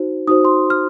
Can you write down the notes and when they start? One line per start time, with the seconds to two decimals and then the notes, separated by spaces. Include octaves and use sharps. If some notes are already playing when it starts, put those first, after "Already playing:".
Already playing: D#4 F#4 C5
0.27 D#4 F#4 C5 D#6
0.45 C6
0.70 F6